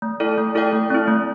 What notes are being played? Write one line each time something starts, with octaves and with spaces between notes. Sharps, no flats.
A3
E4 A4 D5 G5
A3
E4 A4 D5 G5
A3
C4 E4
A3